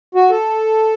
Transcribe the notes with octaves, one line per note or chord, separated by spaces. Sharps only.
F#4
A4